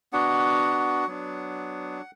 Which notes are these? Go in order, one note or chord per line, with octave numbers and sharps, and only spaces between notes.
B3 D4 F#4 F#5
F#3 B3 D4